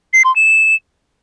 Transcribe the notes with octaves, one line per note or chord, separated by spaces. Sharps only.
C7
C6
E7